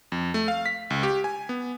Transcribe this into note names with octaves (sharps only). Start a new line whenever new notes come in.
F2
A3
F5
B6
C#2
G4
G#5
B3